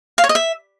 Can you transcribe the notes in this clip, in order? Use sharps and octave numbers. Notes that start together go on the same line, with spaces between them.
F5
C#5
D#5
E5